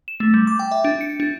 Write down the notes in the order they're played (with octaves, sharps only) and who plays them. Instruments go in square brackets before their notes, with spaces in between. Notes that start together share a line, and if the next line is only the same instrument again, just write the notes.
[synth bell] E7
A3
G3
D6
G5
E5
D4
C#7
D4